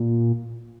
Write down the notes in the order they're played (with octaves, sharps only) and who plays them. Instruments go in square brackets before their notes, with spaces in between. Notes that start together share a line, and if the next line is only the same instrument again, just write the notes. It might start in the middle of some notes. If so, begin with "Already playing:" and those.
Already playing: [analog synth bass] A#2